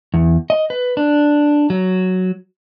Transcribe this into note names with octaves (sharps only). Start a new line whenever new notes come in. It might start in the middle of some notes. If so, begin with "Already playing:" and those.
E2
D#5
B4
D4
F#3